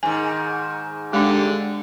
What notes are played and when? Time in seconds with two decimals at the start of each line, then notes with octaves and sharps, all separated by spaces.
0.03 G#2 D#3 G#5
1.13 D3 G#3 D4 G4